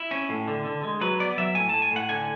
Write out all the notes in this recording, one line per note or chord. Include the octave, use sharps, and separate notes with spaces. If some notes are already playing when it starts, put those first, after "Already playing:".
Already playing: E4
C#4
A2
D3
D3
G#3
F#3 B4
B3 D5
F#3 E5
A2 G#5
A2 A5
G#5
A2 F#5
D3 G#5